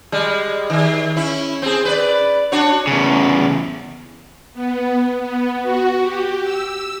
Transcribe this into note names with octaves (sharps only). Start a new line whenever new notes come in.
G3 G#3
D#3
C#4 E4
C4 G#4
B4 D5
D4 F#4 C#5
E2 C#3
B3
B3
F#4
G4
E6